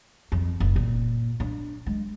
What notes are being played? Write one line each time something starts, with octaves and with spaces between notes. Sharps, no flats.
F2
F#1
A#2
D4
G#3